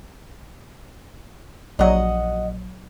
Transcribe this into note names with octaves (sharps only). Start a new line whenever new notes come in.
A#1 F#3 D#5 F#5